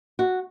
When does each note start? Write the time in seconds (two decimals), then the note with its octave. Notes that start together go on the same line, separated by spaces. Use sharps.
0.19 F#4